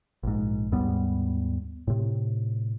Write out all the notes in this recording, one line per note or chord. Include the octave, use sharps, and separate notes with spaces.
A#1 G#2
D#2 G#2 G3 B3
A2 C3